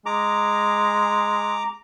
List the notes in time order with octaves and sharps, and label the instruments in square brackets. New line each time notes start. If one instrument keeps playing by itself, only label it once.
[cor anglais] G#3 [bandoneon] A#5 D6